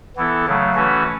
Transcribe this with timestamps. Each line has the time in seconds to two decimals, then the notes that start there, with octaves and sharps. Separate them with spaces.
0.16 E3 B3 E4 A4
0.45 C#3 F#3 A3
0.75 E3 A3 C#4 F#4 B4